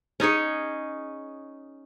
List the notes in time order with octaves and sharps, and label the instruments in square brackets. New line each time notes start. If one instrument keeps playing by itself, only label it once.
[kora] C#4 D#4 G#4 C#5